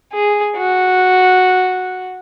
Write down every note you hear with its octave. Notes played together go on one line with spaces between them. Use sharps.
G#4
F#4